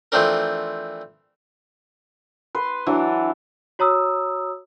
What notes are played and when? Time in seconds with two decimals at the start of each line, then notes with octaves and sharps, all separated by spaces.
0.12 E3 F3 A3 C4 D4 A#4
2.55 B4 C6
2.86 E3 F#3 D4
3.79 F#4 C#5 A#5 D#6 E6